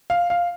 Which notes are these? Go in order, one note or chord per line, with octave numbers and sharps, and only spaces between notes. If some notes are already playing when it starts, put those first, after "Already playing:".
F5
F5